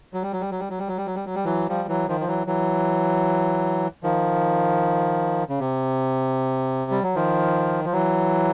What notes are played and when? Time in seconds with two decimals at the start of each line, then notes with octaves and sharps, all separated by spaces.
0.14 F#3
0.23 G3
0.33 F#3
0.41 G3
0.51 F#3
0.59 G3
0.70 F#3
0.79 G3
0.88 F#3
0.97 G3
1.06 F#3
1.16 G3
1.26 F#3
1.35 G3
1.45 E3 F#3
1.69 F3 G3
1.88 E3 F#3
2.08 D#3 F3
2.20 F3
2.28 E3 F#3
2.47 E3 F#3
4.03 D#3 F3
5.49 C#3
5.59 C3
6.91 G3
7.03 F#3
7.15 D#3 F3
7.84 F3
7.92 E3 F#3